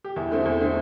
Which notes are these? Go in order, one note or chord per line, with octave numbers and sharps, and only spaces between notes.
G4
E2 E4
D3 A3 C4
E2 E4
D3 A3 C4